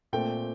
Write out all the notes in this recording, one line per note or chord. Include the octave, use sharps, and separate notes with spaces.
A#2 A3 C4 G5